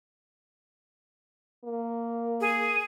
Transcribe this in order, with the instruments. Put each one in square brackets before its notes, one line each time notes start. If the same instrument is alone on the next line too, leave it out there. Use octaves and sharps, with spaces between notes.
[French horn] A#3
[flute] G#4